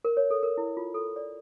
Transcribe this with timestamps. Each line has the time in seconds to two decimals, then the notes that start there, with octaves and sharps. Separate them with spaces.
0.05 A#4
0.17 C#5
0.31 A4
0.43 A#4
0.57 E4
0.77 F4
0.94 A4
1.16 D5